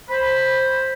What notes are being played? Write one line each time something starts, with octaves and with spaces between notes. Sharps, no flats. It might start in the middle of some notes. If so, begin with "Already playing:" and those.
C5 B5